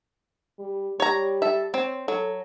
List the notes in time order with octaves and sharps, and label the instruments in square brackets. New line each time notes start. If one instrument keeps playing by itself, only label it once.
[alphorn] G3
[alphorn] G3 [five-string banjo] C#5 A#5
[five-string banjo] A4 E5
[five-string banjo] C4 [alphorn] C#5
[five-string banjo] F#3 [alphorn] A4